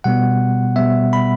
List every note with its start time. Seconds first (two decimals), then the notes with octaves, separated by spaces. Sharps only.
0.04 B2 G3 B3 F#5
0.76 B2 G3 B3 E5
1.13 B5